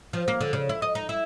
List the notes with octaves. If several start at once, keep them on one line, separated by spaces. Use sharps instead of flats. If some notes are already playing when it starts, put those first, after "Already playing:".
F3
A#3
D3
C#3
E4
D#5
D#4
E4